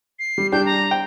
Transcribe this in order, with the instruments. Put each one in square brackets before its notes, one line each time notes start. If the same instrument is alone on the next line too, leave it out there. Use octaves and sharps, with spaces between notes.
[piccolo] C7
[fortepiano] G3
[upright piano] G3 G4 [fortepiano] D4 [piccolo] G6
[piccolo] A#5
[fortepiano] G5